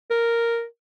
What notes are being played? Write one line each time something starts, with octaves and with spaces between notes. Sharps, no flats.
A#4